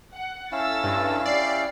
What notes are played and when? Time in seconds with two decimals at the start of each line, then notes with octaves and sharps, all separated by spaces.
0.13 F#5
0.52 C#4 E4 A4 F5 E6 A6
0.83 G2
1.26 G4 D5 G5 C7